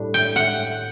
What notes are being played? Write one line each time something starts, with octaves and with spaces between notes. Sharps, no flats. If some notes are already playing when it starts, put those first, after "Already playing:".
Already playing: A2 G3 D4
G5
F#5